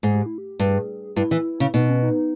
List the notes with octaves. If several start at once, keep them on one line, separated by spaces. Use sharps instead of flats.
G#2 G#4
G4
E4
G4
G2 G#4
G2 E4
E3
C#3
B2 D#4
C#4
D#4